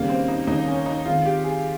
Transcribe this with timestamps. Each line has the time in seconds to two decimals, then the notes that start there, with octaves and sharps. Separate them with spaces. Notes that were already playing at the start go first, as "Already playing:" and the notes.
Already playing: D#2 C#3 G3 A#3
0.09 C4
0.28 D#4
0.47 D#2 C#3 G3 D#4
0.67 C#4
0.86 D#4
1.06 D#3 G#3 C4 F4
1.25 G4
1.44 G#4